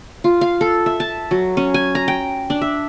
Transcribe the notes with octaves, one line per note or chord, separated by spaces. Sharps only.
F4
F5
A4
E5
A5
F#3
C#4
G#5
A#5
G5
D4
E5